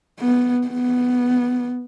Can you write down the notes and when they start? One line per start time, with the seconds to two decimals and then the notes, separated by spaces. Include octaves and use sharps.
0.20 B3
0.68 B3